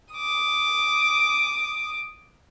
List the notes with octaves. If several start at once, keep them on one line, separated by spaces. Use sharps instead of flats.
D6 D#6